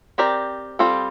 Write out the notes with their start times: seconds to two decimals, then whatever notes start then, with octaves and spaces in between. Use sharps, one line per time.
0.18 C4 G4 A#4 D5
0.79 G3 C4 F4 A4